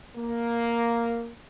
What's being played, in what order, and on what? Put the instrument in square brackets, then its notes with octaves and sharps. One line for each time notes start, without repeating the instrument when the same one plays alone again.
[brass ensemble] A#3